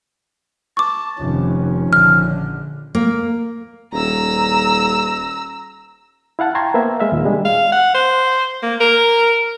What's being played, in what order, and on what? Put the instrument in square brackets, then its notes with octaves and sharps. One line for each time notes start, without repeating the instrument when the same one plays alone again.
[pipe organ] A5 [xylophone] C#6 D6
[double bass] F1 [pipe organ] D#3 F3 C#4
[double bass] A#1 D3 [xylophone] F6
[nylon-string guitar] A#3
[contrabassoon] D#1 [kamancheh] A#5 E6
[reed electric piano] E4 F5 F#5 A5
G5 A5 A#5 C6 C#6 G#6
A#3 B3 A#4 C5 E5
G#3 E5 F5
D#2 A#2
B2 G3 G#3 D4
[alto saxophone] F5
F#5
C5
A#3
A#4